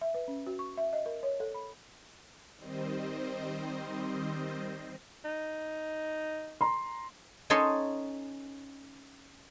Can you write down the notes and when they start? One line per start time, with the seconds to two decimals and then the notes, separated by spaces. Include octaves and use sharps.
0.01 E5
0.14 B4
0.28 C#4
0.47 F#4
0.59 C#6
0.77 E5
0.93 D#5
1.06 A#4
1.23 C#5
1.40 A4
1.54 B5
2.56 D#3 G3 C4 C5 D#5
5.25 D#4
6.61 A#5 C6
7.50 C#4 D#4 A4 C#5 D#5 C6